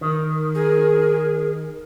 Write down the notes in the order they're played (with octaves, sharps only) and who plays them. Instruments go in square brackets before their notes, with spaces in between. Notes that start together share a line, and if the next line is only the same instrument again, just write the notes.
[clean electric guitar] D#3 [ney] A#4
[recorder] G#4